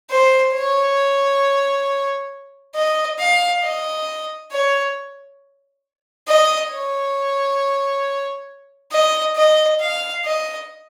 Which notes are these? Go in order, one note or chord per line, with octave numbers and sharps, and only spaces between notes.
C5
C#5
D#5
F5
D#5
C#5
D#5
C#5
D#5
D#5
F5
D#5